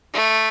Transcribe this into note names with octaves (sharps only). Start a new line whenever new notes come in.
A3